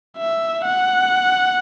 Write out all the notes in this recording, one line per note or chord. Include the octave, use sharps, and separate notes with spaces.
E5
F#5